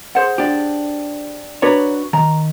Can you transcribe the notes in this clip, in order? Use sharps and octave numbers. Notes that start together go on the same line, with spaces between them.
G#4 C5 F#5
D4 G4
D4 F#4 B4 C#5 A#5
D#3 A#5